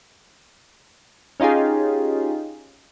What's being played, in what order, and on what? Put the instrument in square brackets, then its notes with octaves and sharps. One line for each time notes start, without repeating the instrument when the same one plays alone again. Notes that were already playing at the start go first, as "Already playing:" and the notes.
[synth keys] C#4 D#4 F4 G4 G#4